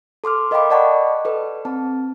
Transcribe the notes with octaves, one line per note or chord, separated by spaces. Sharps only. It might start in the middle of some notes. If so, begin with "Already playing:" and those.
A4 C6 D6 F6
A#4 D#5 F5 G5 B5 D6
D5 D#5 F#5 A5 B5 C#6
A4 B4
C4 A5